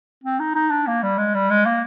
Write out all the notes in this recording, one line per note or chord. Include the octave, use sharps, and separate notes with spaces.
C4
D#4
D#4
D4
A#3
G3
G#3
G3
G#3
A#3